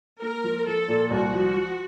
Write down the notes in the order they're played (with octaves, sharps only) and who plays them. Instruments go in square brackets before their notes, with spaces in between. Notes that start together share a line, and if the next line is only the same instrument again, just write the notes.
[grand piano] A#3 [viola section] A#4
[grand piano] F3
[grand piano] F3 [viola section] A4
[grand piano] A#2
[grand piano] C2 [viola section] F#4
[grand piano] F3
F3